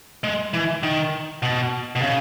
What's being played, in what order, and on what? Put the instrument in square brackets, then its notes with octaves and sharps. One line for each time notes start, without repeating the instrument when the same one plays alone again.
[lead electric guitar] G#3
E3
D#3
B2
B2
C#3